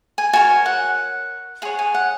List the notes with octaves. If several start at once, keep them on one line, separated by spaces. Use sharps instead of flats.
G#5
F#4 A#4 C#5 G#5
F#5
G#4 C#5 F#5
G#5
F#5